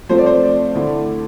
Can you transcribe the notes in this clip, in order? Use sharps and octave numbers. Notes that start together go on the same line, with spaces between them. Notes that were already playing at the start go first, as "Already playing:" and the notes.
F3 A3 C4 C5
D5
C5
D5
D3 A3 E4